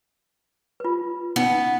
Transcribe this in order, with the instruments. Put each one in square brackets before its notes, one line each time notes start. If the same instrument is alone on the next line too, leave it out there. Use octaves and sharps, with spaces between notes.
[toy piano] F4 B4
[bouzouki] B3 [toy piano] C#4 D#4